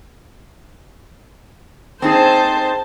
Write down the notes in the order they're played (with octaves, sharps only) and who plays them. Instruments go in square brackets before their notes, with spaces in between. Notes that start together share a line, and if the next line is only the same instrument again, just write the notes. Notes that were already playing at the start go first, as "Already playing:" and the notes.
[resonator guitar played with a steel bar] C4 D#4 G#4 [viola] C5 A5